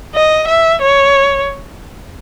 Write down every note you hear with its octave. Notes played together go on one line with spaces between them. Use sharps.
D#5
E5
C#5